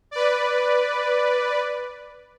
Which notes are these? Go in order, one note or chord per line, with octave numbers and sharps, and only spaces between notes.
B4 D5